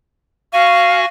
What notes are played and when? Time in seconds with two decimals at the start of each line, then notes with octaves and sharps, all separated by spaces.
0.53 F#4 F5 G#5 C#6